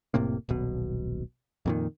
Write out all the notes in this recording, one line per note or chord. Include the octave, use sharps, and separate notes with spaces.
F1 A2 C3 A#3
D#1 B1 B2
F2 A#2 D#3